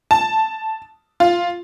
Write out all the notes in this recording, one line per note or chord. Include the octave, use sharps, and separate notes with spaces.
A5
F4